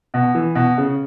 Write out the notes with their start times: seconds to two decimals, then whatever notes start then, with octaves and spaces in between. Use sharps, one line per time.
0.14 B2
0.35 E3
0.55 B2
0.78 C#3